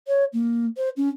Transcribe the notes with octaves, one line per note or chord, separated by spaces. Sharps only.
C#5
A#3
C5
C#4